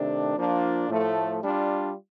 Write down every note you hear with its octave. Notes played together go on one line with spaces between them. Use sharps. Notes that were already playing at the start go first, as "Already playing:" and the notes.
Already playing: C3 D#3 A3 D4
F3 A#3 D4 F4
A2 F3 A3
G3 D4 F4